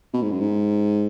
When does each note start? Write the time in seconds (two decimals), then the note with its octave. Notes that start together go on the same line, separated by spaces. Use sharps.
0.13 B2
0.22 G#2
0.32 F#2
0.40 G#2